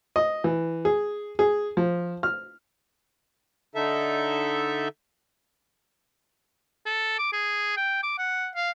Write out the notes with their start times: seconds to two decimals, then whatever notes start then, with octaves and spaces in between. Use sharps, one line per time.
0.16 D#5
0.44 E3
0.85 G#4
1.39 G#4
1.77 F3
2.23 F6
3.75 D3 D#4 A4 E5
6.86 A4
7.19 D6
7.33 G#4
7.77 G5
8.03 D6
8.18 F#5
8.55 F5